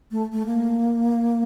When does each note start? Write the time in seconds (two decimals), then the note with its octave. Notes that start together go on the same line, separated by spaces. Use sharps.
0.11 A3
0.32 A3
0.46 A#3